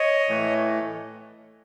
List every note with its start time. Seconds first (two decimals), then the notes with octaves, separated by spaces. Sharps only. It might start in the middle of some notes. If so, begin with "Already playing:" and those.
Already playing: C#5 D#5
0.29 A2 E3 A3